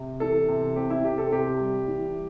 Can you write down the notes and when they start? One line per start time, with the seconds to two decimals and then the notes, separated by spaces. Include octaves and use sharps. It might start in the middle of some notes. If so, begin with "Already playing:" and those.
Already playing: C3
0.20 E3 A4
0.48 C3
0.76 C4 G4
0.90 E4
1.04 C3 G4
1.18 A4
1.32 C3 G4
1.60 G3
1.88 E3